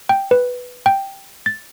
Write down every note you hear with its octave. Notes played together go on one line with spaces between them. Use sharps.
G5
B4
G5
A6